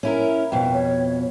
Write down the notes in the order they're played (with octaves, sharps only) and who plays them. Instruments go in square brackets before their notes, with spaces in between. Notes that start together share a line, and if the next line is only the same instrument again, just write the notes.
[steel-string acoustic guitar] C#4 E4 A#4
[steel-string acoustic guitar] F2 B2 [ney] G5
[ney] C#5